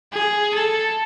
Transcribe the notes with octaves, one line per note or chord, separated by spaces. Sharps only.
G#4
A4